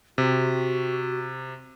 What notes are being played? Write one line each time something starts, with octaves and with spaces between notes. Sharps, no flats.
C3 F#4